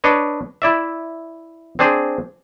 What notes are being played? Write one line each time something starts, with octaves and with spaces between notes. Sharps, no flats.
D4 B4 C#5 D#5
E4 D5 E5
C4 D4 G#4 C5